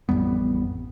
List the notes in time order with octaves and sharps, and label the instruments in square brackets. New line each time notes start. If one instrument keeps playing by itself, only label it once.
[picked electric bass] A1 F2 G3 B3